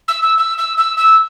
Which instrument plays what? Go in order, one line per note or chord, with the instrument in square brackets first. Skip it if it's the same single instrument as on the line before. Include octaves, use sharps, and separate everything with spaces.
[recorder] E6
E6
E6
E6
E6
E6